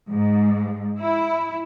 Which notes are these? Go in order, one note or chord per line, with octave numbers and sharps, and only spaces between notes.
G#2
E4